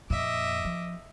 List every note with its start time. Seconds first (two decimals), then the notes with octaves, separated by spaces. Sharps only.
0.10 F2 A#2 D#5 E5 D6
0.65 F3